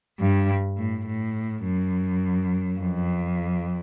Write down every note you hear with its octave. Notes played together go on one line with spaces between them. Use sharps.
G2
A2
A2
F#2
F2